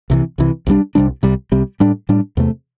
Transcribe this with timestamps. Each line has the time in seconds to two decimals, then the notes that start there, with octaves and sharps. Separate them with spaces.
0.10 C2 C3 E3
0.38 C2 C3 E3
0.67 C2 C3 G3 D4
0.95 C2 C3 G3 D4
1.23 C2 C3 G3
1.52 C2 C3 G3
1.80 A2 G3 D4
2.09 A2 G3 D4
2.37 E2 C3 A3